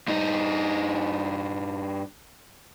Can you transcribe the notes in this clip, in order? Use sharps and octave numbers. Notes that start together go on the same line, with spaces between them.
G2 D#4